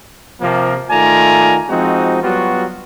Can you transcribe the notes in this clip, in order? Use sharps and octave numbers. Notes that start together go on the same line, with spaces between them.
C3 F3 A#3
D#3 A3 F4 D5 G#5 A#5
F3 G#3 C4 D#4 F#4
F#3 G3 B3 F4 F#4